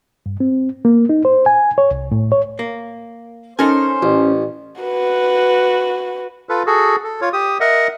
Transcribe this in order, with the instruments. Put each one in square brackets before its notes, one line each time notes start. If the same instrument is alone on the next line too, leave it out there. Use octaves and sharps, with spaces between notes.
[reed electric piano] G2
C4
A#3
D#4
C5
G#5
C#5
C2
A2
C#5
[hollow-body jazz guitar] A#3
[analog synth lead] C#4 [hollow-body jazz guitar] D#4 A4 G#5 [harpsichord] A#4 [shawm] C5
[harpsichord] A1
[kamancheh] F#4 B4
[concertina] F4 A4 B4
F#4 G#4 A4
A4
F4 C#5
G4 D#6
A#4 D#5 E5 F#5